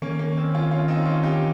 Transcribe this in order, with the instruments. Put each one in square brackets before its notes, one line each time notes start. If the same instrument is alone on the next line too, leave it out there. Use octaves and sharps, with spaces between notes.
[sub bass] D#3 [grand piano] A#3 C#4
[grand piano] A#3
C#4
C4
C#4 F4
C#4 F4
C4 D#4
C#4 F4
D#4 G4